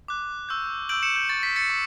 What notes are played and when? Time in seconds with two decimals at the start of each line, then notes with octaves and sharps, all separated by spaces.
0.08 D6 F#6
0.49 C#6 E6 G6
0.89 C#6 E6 G6 D7 F#7
1.03 C#7 E7
1.16 G6
1.29 C#6 G6 A6
1.43 B6
1.56 A6 C#7
1.70 C#6